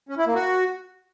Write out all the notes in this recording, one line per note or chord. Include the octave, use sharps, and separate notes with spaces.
C#4
E4
A#3
F#4